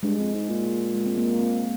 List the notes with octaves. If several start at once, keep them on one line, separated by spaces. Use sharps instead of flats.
G2 G#3
F2
G#2
A#2
G#3
C4
A#3
C4